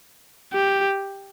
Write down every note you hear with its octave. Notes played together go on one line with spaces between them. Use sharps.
G4